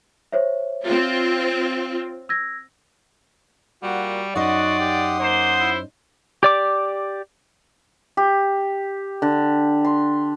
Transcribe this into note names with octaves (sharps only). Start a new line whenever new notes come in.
C5 C#5 E5
C4 F4
E6 G#6 A#6
A#2 G3 F#4 F#5
F#2 D#4 F#4 D5 D#5 F#5 C6 D#6
G4
A#3 C5
E4
G4 D5 D6
G4
D3
C6